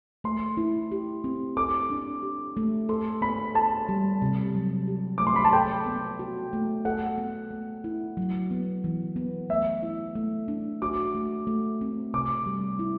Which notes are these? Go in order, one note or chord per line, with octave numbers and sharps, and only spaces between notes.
A3 C6
E4
G4
C4
A4 D6
D4
G4
A3
A4 C6
B3 B5
A4 A5
G3
C3
F#3
G4
A3 D6
C6
B5
A5
A4 G5
B3
F#4
A3
A4 F#5
B3
A3
E4
F#3
B3
E3
B3
A3 E5
E4
A3
D4
F#4 D6
A3
A3
C4
C3 D6
G3
E4